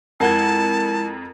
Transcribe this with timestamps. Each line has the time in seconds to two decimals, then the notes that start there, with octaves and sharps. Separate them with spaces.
0.20 F2 G#3 E4 A#4 F#5 A5 G#6